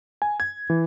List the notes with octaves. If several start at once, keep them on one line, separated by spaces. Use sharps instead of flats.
G#5
G#6
E3